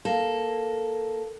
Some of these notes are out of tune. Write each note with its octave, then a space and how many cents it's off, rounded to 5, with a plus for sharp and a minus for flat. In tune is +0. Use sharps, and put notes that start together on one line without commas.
A#3 +5 A4 +0